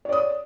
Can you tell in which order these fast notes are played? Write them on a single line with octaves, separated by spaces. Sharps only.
C#5 D5 D#6